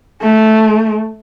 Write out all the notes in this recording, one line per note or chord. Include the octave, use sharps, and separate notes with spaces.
A3